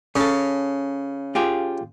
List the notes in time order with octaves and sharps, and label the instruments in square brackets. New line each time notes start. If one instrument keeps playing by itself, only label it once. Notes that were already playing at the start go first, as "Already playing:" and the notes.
[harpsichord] C#3 [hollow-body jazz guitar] C#4 A4
[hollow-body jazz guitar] F4 G4 G#4